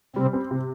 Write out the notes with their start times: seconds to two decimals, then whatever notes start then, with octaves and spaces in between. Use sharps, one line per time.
0.16 C3 G3 C4
0.33 C4
0.51 C3